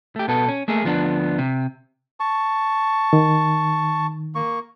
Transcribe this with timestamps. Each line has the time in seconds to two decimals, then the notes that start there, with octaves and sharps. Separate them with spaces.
0.16 A3 G4
0.28 B2 B3 A4
0.48 C#4
0.68 A3 A#3 G#4
0.84 D2 F3 B3 D4
1.38 C3
2.20 A5 C#6
3.13 D#3
4.35 A#3 C#6